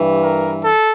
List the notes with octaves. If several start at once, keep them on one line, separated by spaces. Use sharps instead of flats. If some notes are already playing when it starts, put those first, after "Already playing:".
Already playing: G2 E3 G3
A#4
A4